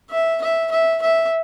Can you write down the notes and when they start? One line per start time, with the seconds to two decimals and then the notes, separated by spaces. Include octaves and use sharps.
0.11 E5
0.42 E5
0.71 E5
1.02 E5